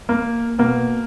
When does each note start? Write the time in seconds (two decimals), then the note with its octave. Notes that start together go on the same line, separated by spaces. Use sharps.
0.09 A#3
0.59 B2 A#3